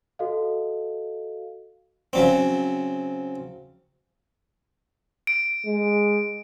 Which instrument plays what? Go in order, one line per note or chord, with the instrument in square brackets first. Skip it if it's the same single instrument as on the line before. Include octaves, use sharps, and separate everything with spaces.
[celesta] F#4 A4 D#5 F5
[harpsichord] C#3 F#3 C4
[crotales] D7
[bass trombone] G#3